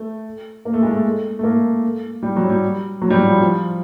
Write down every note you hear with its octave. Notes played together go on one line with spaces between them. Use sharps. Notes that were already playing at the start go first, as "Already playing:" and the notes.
Already playing: A3
A#3
A3
G#3
A3
A3
A#3
G3
F#3
G3
F#3
G3
F#3
F3
F3